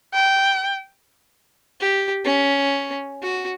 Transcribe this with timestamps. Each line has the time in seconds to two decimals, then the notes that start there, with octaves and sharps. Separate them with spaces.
0.14 G5
1.81 G4
2.25 C#4
3.23 F#4